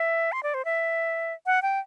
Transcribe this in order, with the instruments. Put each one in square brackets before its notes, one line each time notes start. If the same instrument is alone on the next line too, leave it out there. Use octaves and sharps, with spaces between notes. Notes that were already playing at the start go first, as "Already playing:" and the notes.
Already playing: [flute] E5
C6
D5
C5
E5
F#5
G5